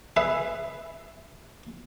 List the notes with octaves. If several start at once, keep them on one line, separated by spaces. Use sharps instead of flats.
G#4 B4 E5